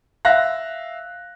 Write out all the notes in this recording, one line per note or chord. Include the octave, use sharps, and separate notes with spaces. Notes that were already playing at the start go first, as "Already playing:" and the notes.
E5 F5 F#6 A#6